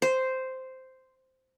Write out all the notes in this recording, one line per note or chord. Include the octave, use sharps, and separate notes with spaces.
C5